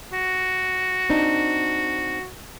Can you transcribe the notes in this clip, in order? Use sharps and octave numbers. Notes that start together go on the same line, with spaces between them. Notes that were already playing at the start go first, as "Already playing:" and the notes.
F#4
C4 D4 D#4